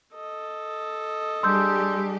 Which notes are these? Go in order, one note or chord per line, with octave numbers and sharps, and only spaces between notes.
A4 D#5
G3 D4 G4 G#4 C6 E6 G6